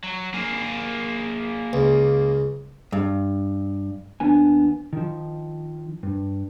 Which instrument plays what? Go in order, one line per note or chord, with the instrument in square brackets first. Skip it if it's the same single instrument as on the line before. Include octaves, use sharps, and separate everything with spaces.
[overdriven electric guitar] F#3
A#3 G#4
[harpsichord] C#2
[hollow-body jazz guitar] G2
[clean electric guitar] D#2 B3 D4 G#5
D#3 F3
G2